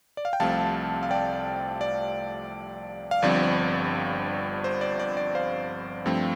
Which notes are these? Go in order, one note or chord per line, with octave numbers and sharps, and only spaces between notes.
D5
F5
G5
C2 C3 F3 A3 C4 F5 A5
F5
D5 G5
D5
F5
G1 G2 F3 C4 D5
C5
D5
D5
D5
C5 F5
G2 F3 A3 C4